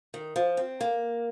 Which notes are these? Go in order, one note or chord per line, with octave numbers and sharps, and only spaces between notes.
D#3
F3
C4
A#3